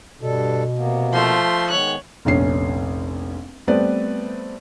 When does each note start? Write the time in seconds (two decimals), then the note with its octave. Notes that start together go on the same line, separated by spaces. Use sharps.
0.22 G2 B2 G3 A4
0.76 C3 A#3 B3
1.13 F3 A3 C6
1.70 D#3 G#3 B3 C#5 F#6
2.25 F1 A#1 C#4 C7
3.67 G3 A3 B3 C4 B4 D5